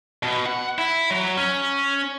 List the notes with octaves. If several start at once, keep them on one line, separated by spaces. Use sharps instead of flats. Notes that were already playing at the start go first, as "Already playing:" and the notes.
B2
F#5
E4
F#3
C#4